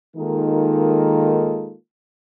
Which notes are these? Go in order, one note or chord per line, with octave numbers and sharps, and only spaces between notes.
D#3 G#3 A#3 D#4 F4 A4